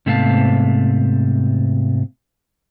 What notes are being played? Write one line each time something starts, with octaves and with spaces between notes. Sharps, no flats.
G#2 C3 A3 B3 F5 A5